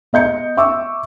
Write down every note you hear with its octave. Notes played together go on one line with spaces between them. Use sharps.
B3 D#5 G6 C#7
E5 C#6 D6 E6